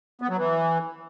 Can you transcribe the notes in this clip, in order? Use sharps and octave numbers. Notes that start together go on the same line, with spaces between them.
B3
F#3
E3